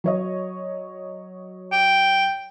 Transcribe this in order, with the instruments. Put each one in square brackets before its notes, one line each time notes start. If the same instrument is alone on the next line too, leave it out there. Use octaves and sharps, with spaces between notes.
[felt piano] F#3 C#5 D#5
[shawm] G5